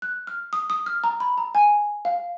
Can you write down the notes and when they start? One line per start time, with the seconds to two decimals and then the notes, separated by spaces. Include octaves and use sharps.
0.02 F#6
0.27 F6
0.53 D#6
0.70 D#6
0.86 F6
1.04 A#5
1.20 B5
1.38 A#5
1.55 G#5
2.05 F5